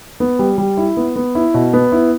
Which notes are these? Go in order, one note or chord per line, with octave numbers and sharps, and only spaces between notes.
B3
G3
G3
E4
B3
B3
E4
B2
B3
E4